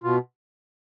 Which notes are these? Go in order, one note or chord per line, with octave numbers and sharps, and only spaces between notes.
B2 F4